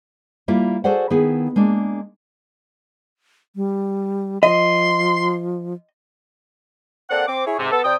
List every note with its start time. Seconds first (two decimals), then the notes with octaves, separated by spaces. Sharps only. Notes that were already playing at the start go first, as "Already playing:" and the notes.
0.48 G3 A#3 E4 F4
0.84 F#4 G#4 A4 C5 D5 F#5
1.10 D#3 B3 E4 G#4
1.56 G#3 A#3 D4
3.56 G3
4.43 F3 D#5 C6
7.10 A#3 C4 A4 D5 F#5
7.27 C4 D6
7.46 E4 G#4 C#5
7.59 G#2 C3
7.71 B3 A4
7.84 C3 D5 G5 D#6